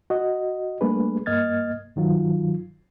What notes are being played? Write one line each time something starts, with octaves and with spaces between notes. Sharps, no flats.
F#4 D#5
G3 A3 A#3 D4 G#4 B4
G2 A#3 D#5 F6 G#6 A6
G2 D#3 F#3 F4